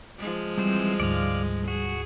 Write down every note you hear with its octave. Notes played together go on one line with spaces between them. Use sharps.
F3 G#3
E3 G3 C4 C5
D2 G#2 D5 F5
F#4 G#4